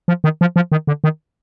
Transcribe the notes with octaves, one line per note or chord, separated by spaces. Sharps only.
F3
D#3
F3
F3
D#3
D3
D#3